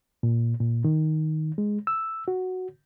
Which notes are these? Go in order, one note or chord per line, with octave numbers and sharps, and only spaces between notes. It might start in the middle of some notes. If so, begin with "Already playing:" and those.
A#2
A#2
D#3
G#3
E6
F#4